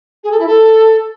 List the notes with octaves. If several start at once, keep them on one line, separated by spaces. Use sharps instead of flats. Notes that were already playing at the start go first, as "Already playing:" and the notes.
G#4
A4
E4
A4